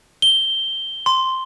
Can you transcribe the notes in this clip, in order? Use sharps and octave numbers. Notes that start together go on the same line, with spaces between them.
G7
C6